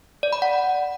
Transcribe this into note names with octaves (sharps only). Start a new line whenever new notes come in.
D5
B5
F#5